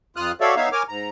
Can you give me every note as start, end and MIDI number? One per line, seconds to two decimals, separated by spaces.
0.16 0.32 41
0.16 0.32 65
0.16 0.32 87
0.16 0.32 89
0.16 0.32 90
0.41 0.55 66
0.41 0.55 69
0.41 0.55 73
0.41 0.55 74
0.41 0.55 76
0.41 0.55 77
0.56 0.69 59
0.56 0.69 63
0.56 0.69 73
0.56 0.69 76
0.56 0.69 77
0.72 0.83 70
0.72 0.83 73
0.72 0.83 80
0.72 0.83 86
0.72 0.83 89
0.89 1.10 44
0.89 1.10 82